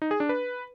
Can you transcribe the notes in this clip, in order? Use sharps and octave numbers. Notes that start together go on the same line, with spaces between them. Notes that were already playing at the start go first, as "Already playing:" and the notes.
D#4
G#4
D4
B4